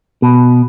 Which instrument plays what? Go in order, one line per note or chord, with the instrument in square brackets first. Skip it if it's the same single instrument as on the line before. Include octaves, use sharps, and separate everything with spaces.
[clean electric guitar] B2